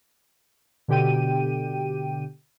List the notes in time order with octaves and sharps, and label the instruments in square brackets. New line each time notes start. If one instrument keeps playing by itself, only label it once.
[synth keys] B2 D3 G4 G5 D#7